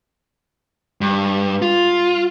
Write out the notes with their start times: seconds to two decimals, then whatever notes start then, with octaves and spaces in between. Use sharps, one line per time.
1.01 G2
1.62 F4